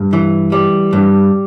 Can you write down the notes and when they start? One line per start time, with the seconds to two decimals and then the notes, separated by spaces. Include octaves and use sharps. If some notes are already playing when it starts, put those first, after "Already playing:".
Already playing: G2
0.13 E3
0.52 G3
0.93 G2